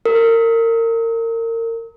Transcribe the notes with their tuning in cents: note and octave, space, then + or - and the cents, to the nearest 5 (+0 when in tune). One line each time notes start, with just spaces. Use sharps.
A#4 -30